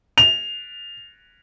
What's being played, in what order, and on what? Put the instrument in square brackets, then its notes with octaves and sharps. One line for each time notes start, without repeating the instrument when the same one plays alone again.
[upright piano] F7